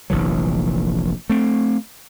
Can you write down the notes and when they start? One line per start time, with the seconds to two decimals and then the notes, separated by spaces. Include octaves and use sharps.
0.10 F1 A#1 E3 F#3
1.30 A3 C4